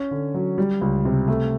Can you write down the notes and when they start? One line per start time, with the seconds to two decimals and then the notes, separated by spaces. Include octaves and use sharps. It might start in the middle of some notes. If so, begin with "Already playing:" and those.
Already playing: C#4
0.11 D3
0.34 F#3
0.58 G3
0.81 C#2
1.05 C3
1.28 A3